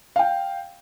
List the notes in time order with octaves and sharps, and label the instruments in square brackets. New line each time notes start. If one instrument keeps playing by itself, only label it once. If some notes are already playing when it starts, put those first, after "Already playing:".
[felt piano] F5 G5